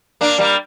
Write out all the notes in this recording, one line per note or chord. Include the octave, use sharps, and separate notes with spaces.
A#3 D4
G3 A#3